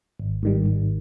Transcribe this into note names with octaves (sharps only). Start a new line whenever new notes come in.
G#1
G#2 D#3 G3
G#1